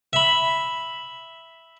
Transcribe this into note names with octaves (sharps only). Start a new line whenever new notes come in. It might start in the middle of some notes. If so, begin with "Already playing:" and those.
E5 B5